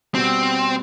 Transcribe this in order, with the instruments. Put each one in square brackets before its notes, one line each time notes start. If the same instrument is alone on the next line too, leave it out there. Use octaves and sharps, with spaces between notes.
[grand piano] B2 G3 B3 [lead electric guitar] C4